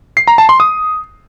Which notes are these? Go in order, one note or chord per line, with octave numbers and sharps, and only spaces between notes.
C7
A#5
A5
C6
D#6